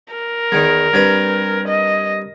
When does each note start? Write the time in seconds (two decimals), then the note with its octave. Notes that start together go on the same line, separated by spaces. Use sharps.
0.13 A#4
0.52 E2 D#3
0.93 G2 C4 B4
1.68 D#5